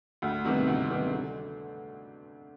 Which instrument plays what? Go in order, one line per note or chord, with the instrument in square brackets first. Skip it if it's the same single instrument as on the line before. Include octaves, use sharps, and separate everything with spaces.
[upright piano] D2
C3 D#3 G3 B3
D2
C3 D#3 G3 B3
D3